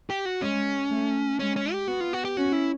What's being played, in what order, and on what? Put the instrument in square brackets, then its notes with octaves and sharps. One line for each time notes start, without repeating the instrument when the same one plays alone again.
[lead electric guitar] G4
F#4
[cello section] G#3 [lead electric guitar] C#4
[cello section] A3
[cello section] G#3 [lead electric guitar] C#4
[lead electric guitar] C#4
G4
[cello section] B3 [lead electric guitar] F#4
[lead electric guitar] F4
F#4
G4
[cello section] C#4 [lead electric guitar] F#4
[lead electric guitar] E4